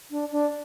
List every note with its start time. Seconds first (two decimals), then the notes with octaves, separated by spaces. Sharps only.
0.11 D4
0.32 D4